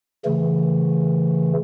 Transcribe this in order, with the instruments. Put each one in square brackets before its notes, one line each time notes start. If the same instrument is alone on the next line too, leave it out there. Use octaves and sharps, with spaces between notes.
[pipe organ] C#3 E3 A3